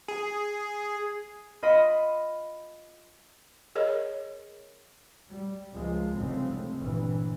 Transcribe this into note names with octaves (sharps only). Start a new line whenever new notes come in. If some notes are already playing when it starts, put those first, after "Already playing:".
G#4
F4 D#5 B5 D7
G#4 A#4 C#5 D#5
G3
C#2 F3 G#3 A#3
F1 C2 C#3 G#3 A3 C4
G1 A#2 E3